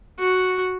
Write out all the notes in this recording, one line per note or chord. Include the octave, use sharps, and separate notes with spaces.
F#4